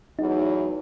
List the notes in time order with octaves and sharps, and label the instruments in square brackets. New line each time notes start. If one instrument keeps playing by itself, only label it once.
[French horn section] E2 A2 F#3 [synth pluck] D#4